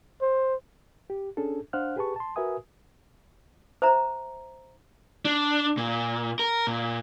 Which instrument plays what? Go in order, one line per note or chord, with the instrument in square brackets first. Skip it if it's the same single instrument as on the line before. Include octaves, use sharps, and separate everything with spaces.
[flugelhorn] C5
[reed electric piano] G4
C#4 D4 G#4 A4
D4 C5 F5 F#5 F6 F#6
G4 G#4 B4 A5 C#6
A5 C6
F#4 A#4 B4 E5 G#5 D#6
[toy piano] C5 E5 A#5
[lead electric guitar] D4
A#2
A#4
A#2